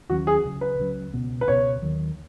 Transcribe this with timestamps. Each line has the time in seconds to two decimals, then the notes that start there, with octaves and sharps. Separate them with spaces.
0.09 D#2 D#3 F#3 C#4 F#4
0.27 G#4
0.44 C#2 C#3 F#3
0.61 B4
0.79 C#2 C#3 F#3
1.14 C#2 B2 B3
1.41 B4
1.47 C#2 B2 B3 C#5
1.82 D#2 D#3 F#3